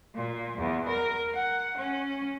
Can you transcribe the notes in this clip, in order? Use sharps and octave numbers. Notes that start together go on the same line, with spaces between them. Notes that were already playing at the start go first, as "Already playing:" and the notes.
A#2
E2
A#4
F#5
C#4